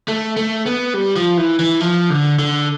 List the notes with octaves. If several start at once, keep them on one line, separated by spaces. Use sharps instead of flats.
A3
A3
B3
G3
F3
E3
E3
F3
D3
D3